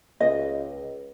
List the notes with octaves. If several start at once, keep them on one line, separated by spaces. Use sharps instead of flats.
C#2 D#5